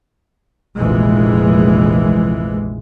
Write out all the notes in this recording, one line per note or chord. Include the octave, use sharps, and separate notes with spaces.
F1 A#1 E3 G#3